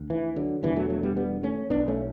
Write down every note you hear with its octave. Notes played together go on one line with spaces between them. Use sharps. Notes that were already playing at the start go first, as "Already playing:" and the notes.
Already playing: D2
E3
D3 F#3
E1 E2 D3 E3 G3
F#3 A3
F#3 A3
G3 B3
G3 B3
A3 C#4
B1 A2 B3 D4
A3 C#4